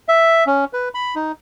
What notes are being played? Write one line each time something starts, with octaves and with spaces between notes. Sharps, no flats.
E5
C#4
B4
B5
D#4